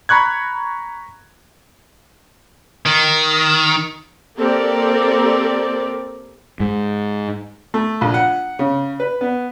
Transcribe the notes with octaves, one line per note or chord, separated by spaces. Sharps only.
A#5 B5 C#6 F#6 G#6
D#3
A#3 C4 G4 A4 A#4 D5
G#2
A3
A#1
F#5
C#3
B4
B3